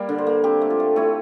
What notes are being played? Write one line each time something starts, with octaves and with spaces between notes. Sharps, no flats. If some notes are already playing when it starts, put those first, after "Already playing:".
Already playing: G3 A#3
D3
C5
A#3
C4 G4
A3
F4
A3
A3 E4